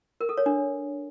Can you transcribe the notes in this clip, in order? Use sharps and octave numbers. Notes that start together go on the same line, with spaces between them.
A#4
A4
C#5
D4